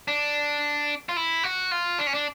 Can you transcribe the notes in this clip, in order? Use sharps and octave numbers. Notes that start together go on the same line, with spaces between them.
D4
F4
E4
F#4
F4
D4
C#4
D4